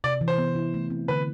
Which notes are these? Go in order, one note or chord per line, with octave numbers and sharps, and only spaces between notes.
C3 D5
E3
C5
B3
E4
A3
C4
D3 B4